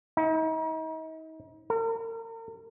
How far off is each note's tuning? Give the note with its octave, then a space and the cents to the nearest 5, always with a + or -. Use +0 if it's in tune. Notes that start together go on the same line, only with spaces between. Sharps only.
D#4 +40
A#4 -40